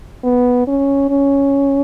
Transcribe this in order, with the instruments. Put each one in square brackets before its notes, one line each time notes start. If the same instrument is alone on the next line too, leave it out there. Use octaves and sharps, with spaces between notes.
[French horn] B3
C#4
C#4